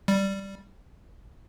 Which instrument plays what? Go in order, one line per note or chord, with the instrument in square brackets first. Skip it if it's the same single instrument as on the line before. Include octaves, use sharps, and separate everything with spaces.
[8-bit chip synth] G3